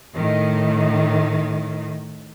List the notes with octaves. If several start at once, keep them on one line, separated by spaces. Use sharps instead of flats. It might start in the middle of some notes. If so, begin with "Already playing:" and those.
A2 D#3